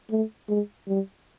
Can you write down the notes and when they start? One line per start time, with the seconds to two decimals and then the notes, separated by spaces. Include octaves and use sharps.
0.11 A3
0.49 G#3
0.88 G3